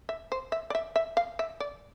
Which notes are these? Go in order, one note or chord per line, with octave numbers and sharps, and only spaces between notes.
E5
C5
E5
D5
E5
E5
F5
E5
D5